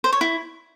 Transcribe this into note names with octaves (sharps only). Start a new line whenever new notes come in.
C5
C#5
E4